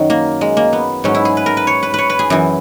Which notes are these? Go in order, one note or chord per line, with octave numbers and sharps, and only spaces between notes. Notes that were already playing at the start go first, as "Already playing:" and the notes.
Already playing: F#2 D#3 F#3
A#3
G#3
A#3
B3
G#2 F#3 C#4
E4
G#4
B4
A#4
B4
C#5
B4
B4 C#5
B4
G#4
F#2 E3